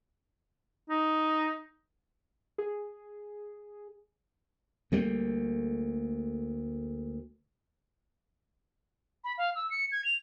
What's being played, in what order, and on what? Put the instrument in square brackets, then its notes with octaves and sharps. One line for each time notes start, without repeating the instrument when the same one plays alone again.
[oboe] D#4
[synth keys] G#4
[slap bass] D2 G3 A3 A#3
[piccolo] B5
F5
E6
C#7
G#6
F7